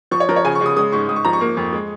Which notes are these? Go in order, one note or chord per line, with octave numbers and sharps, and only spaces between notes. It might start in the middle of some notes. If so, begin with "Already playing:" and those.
F3 C#6
C#5
F3 A#4
C#5
C#3 G#5
C#6
C#3 D#6
G#3 D#6
G#2 C#6
G#2 D#6
C#6
F3 A#5
C#6
A#3
F2
G#3